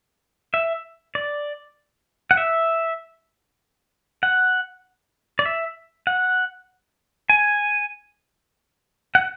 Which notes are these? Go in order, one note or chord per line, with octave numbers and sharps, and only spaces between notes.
E5
D5
F#5
E5
F#5
D5
E5
F#5
G#5
F#5